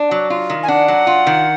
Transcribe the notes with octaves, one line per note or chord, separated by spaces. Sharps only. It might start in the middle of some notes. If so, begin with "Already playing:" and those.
Already playing: D4
F#3
F4
D#3
G#5
D4 F#5
F#3
F4
D#3